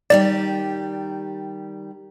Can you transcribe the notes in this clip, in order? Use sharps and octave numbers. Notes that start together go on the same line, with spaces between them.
D#3 G3 G4 D5